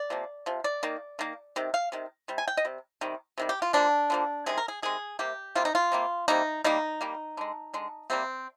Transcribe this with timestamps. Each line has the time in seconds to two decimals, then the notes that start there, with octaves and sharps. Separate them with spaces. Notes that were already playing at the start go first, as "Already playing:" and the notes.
Already playing: D5
0.10 C3 F3 A#3
0.46 C3 F3
0.64 D5
0.83 D#3 A#3
1.19 D#3 A#3
1.56 C3 D#3
1.74 F5
1.92 C3 D#3
2.28 C3 G3
2.38 G#5
2.48 G5
2.57 D#5
2.65 C3 G3
3.01 C3 D#3 G3
3.38 C3 D#3 G3
3.49 G4
3.62 F4
3.73 D3 F3 A#3 D4
4.10 D3 F3 A#3
4.46 C3 D#3 G#3 G#4
4.58 A#4
4.68 G#4
4.82 C3 D#3 G#3 G#4
5.19 C3 G3 A#3 G4
5.55 C3 G3 A#3 F4
5.65 D#4
5.75 F4
5.92 C3 G3 A#3
6.28 C3 G3 A#3 D#4
6.64 D#3 G3 A#3 D#4
7.01 D#3 G3 A#3
7.37 D3 G#3
7.74 D3 G#3
8.10 C3 G3 A#3 C4